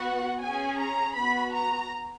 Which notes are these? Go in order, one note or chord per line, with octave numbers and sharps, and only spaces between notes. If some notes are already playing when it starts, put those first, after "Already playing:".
Already playing: B3 F#4 F#5
C#4 G#4 G#5
A#5
B3 F#4 B5
A#5